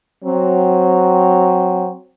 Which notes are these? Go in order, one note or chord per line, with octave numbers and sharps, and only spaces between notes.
F#3 C4